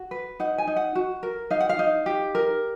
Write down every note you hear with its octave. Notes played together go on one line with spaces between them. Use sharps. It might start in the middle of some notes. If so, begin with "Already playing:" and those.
Already playing: F#4
B4
D#4 F#5
G#5
D#4
F#5
F#4
A#4
D#4 F5
F#5
F5
D#4
G4
A#4